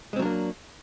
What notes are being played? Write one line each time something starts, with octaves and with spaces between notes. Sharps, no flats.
F#3 G#3 A#3 C4 D4